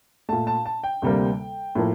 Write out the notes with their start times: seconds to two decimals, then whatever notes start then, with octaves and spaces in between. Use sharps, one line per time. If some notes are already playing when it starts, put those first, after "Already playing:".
0.29 A#2 A3 A5
0.47 A5
0.66 A5
0.84 G5
1.02 D2 C3 G3 A#3
1.75 A2 F3 A#3